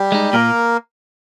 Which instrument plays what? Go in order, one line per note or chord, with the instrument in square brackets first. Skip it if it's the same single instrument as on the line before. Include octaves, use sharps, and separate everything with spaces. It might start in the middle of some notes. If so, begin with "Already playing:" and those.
Already playing: [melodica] G3 G4
[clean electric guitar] G#3 D#4
[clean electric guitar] A#2 [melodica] A#3 A#4